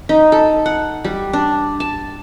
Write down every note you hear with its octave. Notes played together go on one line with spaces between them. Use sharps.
D#4
A4
F#5
G3
D4
A5